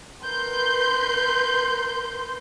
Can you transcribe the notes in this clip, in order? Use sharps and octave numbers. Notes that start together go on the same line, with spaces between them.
A#4 B4 C6 G6